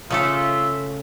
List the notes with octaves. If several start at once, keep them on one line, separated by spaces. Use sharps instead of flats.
C#3 A3 F4 A4 E5